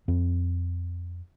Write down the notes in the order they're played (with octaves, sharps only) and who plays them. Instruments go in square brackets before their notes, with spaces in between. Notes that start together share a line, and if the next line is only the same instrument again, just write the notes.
[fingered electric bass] F2 C4